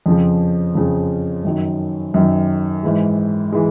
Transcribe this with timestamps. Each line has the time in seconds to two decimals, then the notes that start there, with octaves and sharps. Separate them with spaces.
0.06 F2 C#3 F3
0.75 F2 C#3 F3
1.44 F#2 D#3 F#3
2.14 F#2 D#3 F#3
2.83 G#2 E3 G#3
3.52 E3 G#3